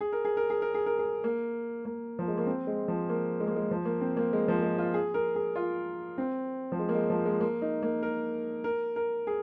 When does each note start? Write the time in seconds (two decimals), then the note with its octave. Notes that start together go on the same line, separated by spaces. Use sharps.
0.01 G#4
0.12 A#4
0.25 G#4
0.37 A#4
0.50 G#4
0.62 A#4
0.74 G#4
0.86 A#4
0.99 G#4
1.24 A#3
1.85 A#3
2.19 F3
2.28 G#3
2.37 A#3
2.46 C4
2.67 G#3
2.88 F3
3.09 A#3
3.40 G#3
3.48 A#3
3.56 G#3
3.71 F3
3.85 A#3
4.01 C4
4.17 A#3
4.33 G#3
4.48 F3
4.63 G#3
4.78 F4
4.94 G#4
5.14 A#4
5.36 G#4
5.56 F4
6.18 C4
6.72 F3
6.79 G#3
6.89 A#3
6.94 G#3
7.10 F3
7.25 G#3
7.41 A#3
7.62 D#4
7.82 A#3
8.03 A#4
8.64 A#4
8.96 A#4
9.27 G#4